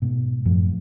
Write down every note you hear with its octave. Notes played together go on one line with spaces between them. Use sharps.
G#2 B2
F#2 A2 F3